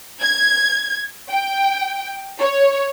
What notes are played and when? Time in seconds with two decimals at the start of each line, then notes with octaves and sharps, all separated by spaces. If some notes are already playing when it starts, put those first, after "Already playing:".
0.22 G#6
1.31 G5
2.40 C#5